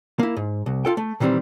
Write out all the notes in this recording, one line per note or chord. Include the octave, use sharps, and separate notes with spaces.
A#3 E4
G#2
C2
F4 A4 G5
A3
A#2 D#3 E3 G3 C4